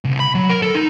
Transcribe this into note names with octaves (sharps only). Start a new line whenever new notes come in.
C2
B5
F#3
A#4
A4
D#4